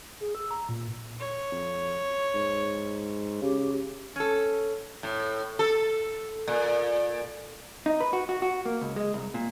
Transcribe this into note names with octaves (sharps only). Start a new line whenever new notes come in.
G#4
E6
A#5
A#2
C#5
F2
G#2
C#3 G4
C#4 A4
A2
A4
A#2
D#4
B4
F#4
F#4
F#4
A#3
C#2
G#3
C2
A#2